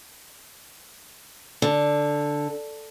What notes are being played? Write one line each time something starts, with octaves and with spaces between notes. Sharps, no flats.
D3